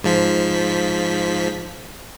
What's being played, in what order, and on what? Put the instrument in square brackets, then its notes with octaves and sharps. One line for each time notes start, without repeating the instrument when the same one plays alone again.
[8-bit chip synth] G#2 F3 B6